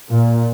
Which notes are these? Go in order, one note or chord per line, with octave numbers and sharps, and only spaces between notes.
A#2